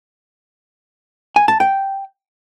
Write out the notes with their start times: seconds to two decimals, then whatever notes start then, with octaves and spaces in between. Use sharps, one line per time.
1.36 G#5
1.48 A5
1.60 G5